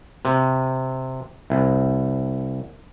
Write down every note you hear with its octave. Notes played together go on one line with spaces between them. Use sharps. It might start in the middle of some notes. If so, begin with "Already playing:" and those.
C3
C2